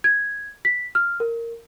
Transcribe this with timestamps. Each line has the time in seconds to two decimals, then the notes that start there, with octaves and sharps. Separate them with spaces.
0.04 G#6
0.65 B6
0.95 F6
1.20 A#4